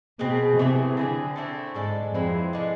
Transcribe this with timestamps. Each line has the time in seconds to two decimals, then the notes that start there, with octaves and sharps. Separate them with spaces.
0.19 B2 G#3 C4 G#4 B4
0.58 C3 E3 A3 E4 G#4
0.97 D3 C4 G#4 B4
1.36 A3 C4 E4 A4
1.74 G#2 G#3 D4 A4
2.14 F2 E3 G#3 C4 E4
2.53 D3 G#3 D4